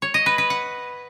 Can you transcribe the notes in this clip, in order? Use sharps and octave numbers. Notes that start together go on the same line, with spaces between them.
C#5
D#5
B4
B4
F#5